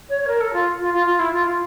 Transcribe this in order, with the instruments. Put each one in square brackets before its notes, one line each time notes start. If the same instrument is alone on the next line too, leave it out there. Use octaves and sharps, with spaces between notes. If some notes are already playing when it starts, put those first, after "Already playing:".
[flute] C#5
C#5
A#4
A4
F4
F4
F4
F4
E4
F4
F4